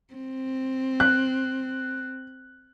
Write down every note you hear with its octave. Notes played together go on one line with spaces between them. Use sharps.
C4
F#6